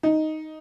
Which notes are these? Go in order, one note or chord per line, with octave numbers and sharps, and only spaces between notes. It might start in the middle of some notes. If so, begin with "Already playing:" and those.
D#4